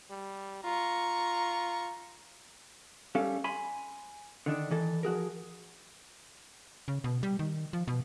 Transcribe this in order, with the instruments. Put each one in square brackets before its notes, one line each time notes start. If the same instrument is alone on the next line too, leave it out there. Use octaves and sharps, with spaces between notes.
[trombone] G3
[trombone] F4 [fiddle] A#5 C#6
[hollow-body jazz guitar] G3 C#4 A4 F5
G#5 B5 C6
D3 D#3 D4
D#3 E3 A4
F3 F#4 G#4 A#4
[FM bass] C#3
B2
G3
D#3
F3
B2